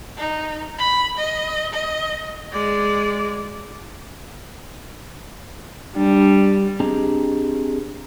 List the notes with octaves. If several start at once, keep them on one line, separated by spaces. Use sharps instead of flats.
D#4
B5
D#5
D#5
G#3 D5
G3 D4
C4 D4 G4 G#4 D#5 A#5